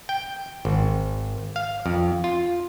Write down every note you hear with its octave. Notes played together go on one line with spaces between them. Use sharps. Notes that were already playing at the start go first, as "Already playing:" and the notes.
G5
G#1
F5
F2
F4